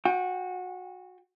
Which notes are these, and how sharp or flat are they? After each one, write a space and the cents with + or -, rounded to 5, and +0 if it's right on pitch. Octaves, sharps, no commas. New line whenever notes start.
F#4 -20 G5 +20